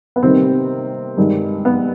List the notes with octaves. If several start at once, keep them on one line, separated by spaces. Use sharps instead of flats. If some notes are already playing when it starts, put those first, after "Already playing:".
B3
C3 D#3 G3 A#3 C4
G2 D#3 G#3
B3